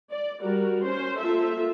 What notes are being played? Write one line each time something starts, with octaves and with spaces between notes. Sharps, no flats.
D5
G3 F#4 A#4
C#4 C5
A#3 F4 A4 E5